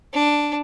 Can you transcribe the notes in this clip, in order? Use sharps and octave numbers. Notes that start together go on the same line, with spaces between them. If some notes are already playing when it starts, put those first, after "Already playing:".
D4